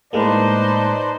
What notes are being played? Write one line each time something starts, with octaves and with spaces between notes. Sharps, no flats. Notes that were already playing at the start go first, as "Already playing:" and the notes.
A2 G#3 A#3 D#4 B4 C5 D5 A5